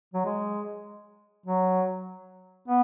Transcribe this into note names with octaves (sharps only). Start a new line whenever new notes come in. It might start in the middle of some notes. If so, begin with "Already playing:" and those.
F#3
G#3
F#3
B3